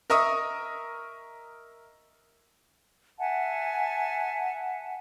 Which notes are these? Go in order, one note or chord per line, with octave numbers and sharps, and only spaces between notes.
A#4 D#5 E5 C#6 D#6
E5 F#5 G#5 A5